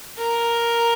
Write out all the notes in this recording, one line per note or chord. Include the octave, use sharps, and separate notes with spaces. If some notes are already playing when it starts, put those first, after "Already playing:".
A#4